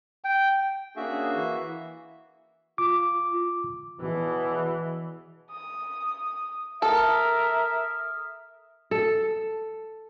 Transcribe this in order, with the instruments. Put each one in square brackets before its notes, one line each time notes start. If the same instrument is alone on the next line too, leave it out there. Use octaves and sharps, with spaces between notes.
[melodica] G5
[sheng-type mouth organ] A#3 F#4 E5 [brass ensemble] C#4 D4 G#4
[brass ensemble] E3
[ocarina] F4 [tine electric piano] D6
[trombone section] E2 B2 [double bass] E3
[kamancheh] D#6
[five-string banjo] A4 [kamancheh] A#4 [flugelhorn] E5 [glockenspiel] D#6 F6
[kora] A4